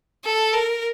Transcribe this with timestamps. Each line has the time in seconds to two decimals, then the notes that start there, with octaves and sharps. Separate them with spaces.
0.24 A4
0.53 A#4